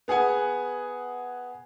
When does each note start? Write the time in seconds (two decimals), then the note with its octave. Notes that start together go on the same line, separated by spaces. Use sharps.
0.08 B3 G#4 F#5 G#5